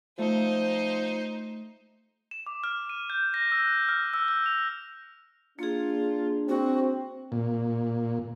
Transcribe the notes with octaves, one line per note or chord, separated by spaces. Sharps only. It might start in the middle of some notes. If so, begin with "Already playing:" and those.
F3 A3 D#4 C5
E7
D6
F6
D#7
G6
A#6
E6
F#6
F6
E6
E6
F7
A#3 D4 F4 G#4
C4 F#4
A#2